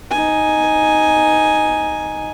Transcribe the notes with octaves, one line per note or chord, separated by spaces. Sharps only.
D#4 G#5